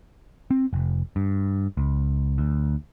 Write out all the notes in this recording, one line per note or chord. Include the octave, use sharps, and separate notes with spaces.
C4
F1
G2
C#2
D2